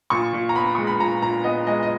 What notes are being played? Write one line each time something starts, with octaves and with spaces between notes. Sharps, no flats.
A#2 C#6
A#2
A#5
B3 B5
G#3 C#6
B5
A#2 A#5
A#2 A#5
B3 D#5
G#3 D#5
D#5